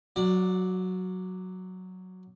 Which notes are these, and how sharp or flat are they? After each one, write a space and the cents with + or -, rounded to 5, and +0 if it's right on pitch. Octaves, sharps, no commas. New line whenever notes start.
F#3 +0 D5 +0 F#5 -40